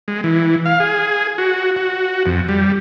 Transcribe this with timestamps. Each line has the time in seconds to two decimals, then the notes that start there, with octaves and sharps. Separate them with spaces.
0.08 G#3
0.24 E3
0.65 F5
0.80 G#4
1.38 F#4
1.76 F#4
2.26 F2
2.49 G3